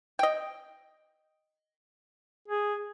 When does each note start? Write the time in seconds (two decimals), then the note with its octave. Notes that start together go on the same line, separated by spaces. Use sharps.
0.19 D#5 G5
2.48 G#4